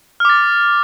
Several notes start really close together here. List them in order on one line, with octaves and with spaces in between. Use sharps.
F6 D6 A6